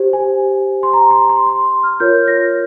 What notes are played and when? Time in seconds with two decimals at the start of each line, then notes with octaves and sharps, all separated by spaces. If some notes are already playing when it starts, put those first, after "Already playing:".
Already playing: G4 C5
0.13 G#5
0.83 C6
0.93 A#5
1.11 C6
1.29 C6
1.47 C6
1.83 F6
2.00 F4 A#4 C#5 G6
2.27 A#6